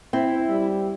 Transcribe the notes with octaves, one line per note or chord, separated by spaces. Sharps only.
C4 E4
G3